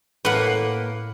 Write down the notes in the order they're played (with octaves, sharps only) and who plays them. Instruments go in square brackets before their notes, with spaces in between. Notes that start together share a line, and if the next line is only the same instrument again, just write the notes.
[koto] A2 F#5 [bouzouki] A#3 B4